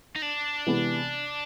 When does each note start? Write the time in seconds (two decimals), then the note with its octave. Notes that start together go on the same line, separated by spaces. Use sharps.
0.16 D#4
0.22 D4
0.67 C3 E3 G#3 B3